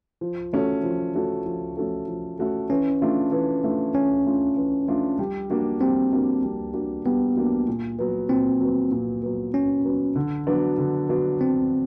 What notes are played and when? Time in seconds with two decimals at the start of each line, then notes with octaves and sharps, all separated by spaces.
0.21 F3
0.53 A3 C#4 F#4 A4
0.83 F3
1.15 A3 C#4 F#4 A4
1.46 F3
1.77 A3 C#4 F#4 A4
2.08 F3
2.39 A3 C#4 F#4 A4
2.70 E3 C#4
3.01 A3 D4 F4
3.32 E3
3.64 A3 D4 F4
3.94 E3 C#4
4.26 A3 D4 F4
4.57 E3
4.88 A3 D4 F4
5.19 G3
5.50 A#3 D4 F#4
5.81 G3 C4
6.12 A#3 D4 F#4
6.43 G3
6.74 A#3 D4 F#4
7.05 G3 B3
7.37 A#3 D4 F#4
7.68 A#2
7.99 F#3 B3
8.29 A#2 C4
8.61 F#3 B3
8.91 A#2
9.22 F#3 B3
9.53 A#2 C#4
9.85 F#3 B3
10.16 D3
10.47 F#3 B3 D4 F#4
10.78 D3
11.09 F#3 B3 D4 F#4
11.40 D3 C4